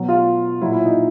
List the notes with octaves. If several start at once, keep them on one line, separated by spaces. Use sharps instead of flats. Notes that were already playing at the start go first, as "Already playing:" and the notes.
Already playing: B2 F#3
F4
A#2 F#3 E4
E4
D#4